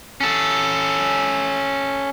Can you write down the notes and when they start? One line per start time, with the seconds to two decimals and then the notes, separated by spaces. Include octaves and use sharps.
0.21 C#4 A4